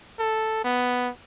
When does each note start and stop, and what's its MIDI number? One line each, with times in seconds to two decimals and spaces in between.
0.19 0.63 69
0.64 1.10 59